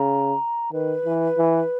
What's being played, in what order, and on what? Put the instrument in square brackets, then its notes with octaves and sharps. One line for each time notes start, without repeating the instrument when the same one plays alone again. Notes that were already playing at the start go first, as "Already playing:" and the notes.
Already playing: [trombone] C#3 [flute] A#5
[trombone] D#3 [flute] B4
[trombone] E3
E3